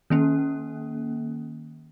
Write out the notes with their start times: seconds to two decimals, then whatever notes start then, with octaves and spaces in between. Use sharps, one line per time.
0.10 D#3 A#3 C#4